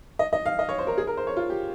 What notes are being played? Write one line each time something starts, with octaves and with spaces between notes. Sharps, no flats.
D#5
D#5
F5
D#5
C#5
C5
A#4
G#4
A#4
C5
C#5
F4
G4